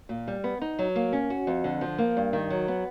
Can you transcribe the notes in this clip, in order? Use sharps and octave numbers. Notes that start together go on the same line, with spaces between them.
A#2
G3
B3
D#4
F#3
A#3
C#4
F#4
F2
D3
F3
A#3
G2
D#3
F#3
B3